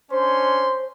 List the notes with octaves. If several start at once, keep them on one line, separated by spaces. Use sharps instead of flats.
C#4 D4 C5 C6